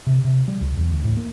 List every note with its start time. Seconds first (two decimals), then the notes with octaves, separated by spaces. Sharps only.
0.07 C3
0.25 C3
0.48 G3
0.61 C#2
0.77 E2
0.91 D2
1.04 A2
1.17 A#3